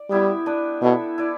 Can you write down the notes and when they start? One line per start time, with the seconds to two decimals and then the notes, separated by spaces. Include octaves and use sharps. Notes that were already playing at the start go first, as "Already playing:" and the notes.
Already playing: D5
0.10 G3 B3 E4 G4 E5
0.46 D4 B4 D5
0.82 B2 E4 A4 E5
1.18 E4 B4 D5